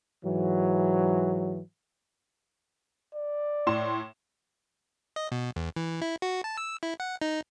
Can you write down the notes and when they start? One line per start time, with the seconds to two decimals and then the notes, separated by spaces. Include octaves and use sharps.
0.24 G#2 E3 F#3
3.14 D5
3.67 A2 C6 E7
5.16 D#5
5.32 B2
5.56 E2
5.76 E3
6.01 E4
6.22 F#4
6.44 A5
6.57 E6
6.83 E4
7.00 F#5
7.22 D#4